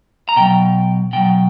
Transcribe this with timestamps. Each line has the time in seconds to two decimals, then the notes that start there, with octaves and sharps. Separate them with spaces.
0.29 A#5
0.36 B2 F#3 G5
1.13 B2 F#3 G5